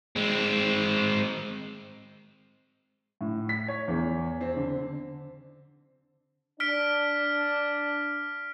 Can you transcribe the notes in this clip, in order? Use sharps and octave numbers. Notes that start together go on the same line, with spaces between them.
G#3 C4
A2
B6
C#5
E2
C4
D3
D4 F6 B6 D7